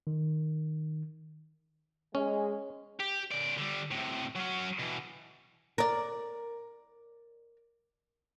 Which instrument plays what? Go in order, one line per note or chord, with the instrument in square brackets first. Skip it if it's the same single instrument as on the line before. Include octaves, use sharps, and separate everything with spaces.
[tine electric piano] D#3
[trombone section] G#3 [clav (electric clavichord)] C#4
[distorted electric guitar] G4
C#3 D5
D3 G3
A2 C3
F#3 C#4
B2 E3
[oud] A#4 D5